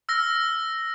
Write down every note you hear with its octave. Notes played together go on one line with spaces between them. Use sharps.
E6 F6 A#6